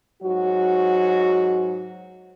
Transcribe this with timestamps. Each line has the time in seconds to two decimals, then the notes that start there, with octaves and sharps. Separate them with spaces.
0.23 G#2 F#3 F#4